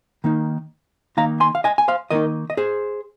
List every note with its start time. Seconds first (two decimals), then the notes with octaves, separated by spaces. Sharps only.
0.24 D#3 A#3 D#4
1.17 D#3 A#3 D#4 F5 A#5
1.40 G#5 C6
1.55 F5
1.64 D#5 G#5
1.78 G#5
1.88 C5 F5
2.11 D#3 A#3 D#4 A#4 D#5
2.50 D#5
2.57 G#4 C5